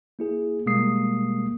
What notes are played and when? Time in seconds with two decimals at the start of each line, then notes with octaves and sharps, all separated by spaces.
0.19 A#3 E4 G#4
0.66 B2 G3 G#3 A#3 D#6 C7